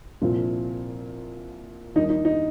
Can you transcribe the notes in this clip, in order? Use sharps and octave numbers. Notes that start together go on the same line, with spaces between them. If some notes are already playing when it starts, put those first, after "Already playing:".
C2 A#2 F3 C4
D#2 D#3 G3 D#4
D#4
D#4